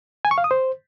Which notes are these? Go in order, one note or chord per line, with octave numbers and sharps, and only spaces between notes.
G#5
C#6
F5
D#6
C5